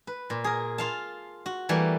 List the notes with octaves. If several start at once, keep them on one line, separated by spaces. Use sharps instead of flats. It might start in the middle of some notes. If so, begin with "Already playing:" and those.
B4
A#2
G#4 A#4
F4 F5 A5
F#4
E3 G3 A3 A#3